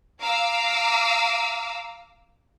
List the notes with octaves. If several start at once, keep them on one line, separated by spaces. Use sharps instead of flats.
F5 A#5 D6 E6